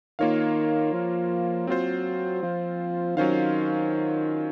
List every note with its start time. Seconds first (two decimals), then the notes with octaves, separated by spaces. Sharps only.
0.19 D#3 A#3 F4 A#4 C#5 F5
0.93 F3
1.67 F#3 C4 F4 C5
2.43 F3
3.16 D#3 F#3 C#4 F4 C5 F5